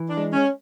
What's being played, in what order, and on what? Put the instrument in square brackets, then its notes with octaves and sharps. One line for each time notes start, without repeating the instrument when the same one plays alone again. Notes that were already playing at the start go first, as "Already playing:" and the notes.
Already playing: [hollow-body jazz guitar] E3
[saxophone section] D4
[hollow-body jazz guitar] G#3
[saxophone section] C#4